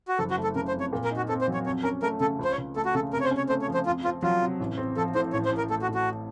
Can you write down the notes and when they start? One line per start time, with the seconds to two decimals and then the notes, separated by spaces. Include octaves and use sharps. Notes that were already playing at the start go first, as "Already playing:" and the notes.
0.08 F#4
0.19 F#1 A4
0.31 F#4
0.38 A3
0.43 A4
0.55 C#3 A#4
0.68 C5
0.73 F2
0.80 C#5
0.93 A#2
1.04 A#4
1.11 D#4
1.17 F#4
1.29 C4 A4
1.41 C5
1.48 F#3
1.54 C#5
1.65 F2 C#5
1.83 C#4 A#4
2.02 A3 A#4
2.20 C#3 A4
2.39 C#2
2.44 C5
2.52 C#5
2.58 C#2
2.76 A3 A4
2.85 F#4
2.94 C#3 A4
3.12 C3 A#4
3.21 C#5
3.25 C5
3.31 C#4
3.37 C#5
3.49 A3 C5
3.62 C#5
3.68 F3
3.74 C5
3.86 F2 F4
4.04 C4 F4
4.23 F#3 F4
4.41 C3
4.60 A1
4.78 C4
4.97 F3 A4
5.15 A2 C5
5.33 A1 C#5
5.45 C5
5.51 A1
5.58 A#4
5.70 A3 A4
5.82 F#4
5.88 A2
5.95 F#4